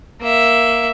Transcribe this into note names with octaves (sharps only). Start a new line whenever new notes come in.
A#3 E5